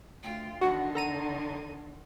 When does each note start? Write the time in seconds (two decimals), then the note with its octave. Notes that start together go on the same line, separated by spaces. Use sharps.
0.23 D2 F4 G5
0.61 E2 G#2 D3 D#3 D4 F#4 F#5
0.95 A4 A#5 D#7